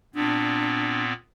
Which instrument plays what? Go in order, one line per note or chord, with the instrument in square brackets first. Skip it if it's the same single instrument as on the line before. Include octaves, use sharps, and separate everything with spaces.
[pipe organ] A#2 B3 C4 [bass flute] D4